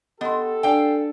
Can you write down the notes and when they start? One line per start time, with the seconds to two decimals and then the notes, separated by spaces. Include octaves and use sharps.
0.21 B3 G4 A4 D#5 C6
0.63 D4 D5 F5 G5 G#5